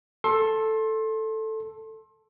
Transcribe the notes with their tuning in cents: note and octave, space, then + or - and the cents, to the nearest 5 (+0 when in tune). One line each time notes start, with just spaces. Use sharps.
A4 +0 C6 +30